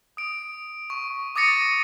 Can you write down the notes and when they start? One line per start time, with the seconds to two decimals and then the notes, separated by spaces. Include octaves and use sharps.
0.17 D#6 D7
0.90 C#6
1.36 D6 D#6 A6 A#6 C#7 D#7